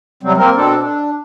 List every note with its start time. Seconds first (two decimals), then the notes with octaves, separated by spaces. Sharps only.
0.23 C3 F#3 G3 C4
0.37 A#3 C4 A#4
0.56 B2 C4 D4 A4
0.80 D4